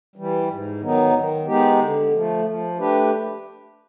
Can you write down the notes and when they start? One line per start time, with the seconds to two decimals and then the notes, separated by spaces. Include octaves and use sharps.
0.16 E3 G3
0.49 G#2
0.81 D#3 F#3 B3 D#4
1.14 D#3
1.47 G#3 B3 D#4 G4
1.80 D3
2.12 F3 A3
2.45 F3
2.78 A3 D4 G4 B4